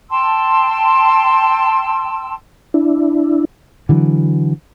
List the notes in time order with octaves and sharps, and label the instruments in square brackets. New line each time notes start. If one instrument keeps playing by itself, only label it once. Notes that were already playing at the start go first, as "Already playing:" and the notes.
[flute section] G5 A5 C6 E6
[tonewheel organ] D4 E4
[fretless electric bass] D3 E3 F#3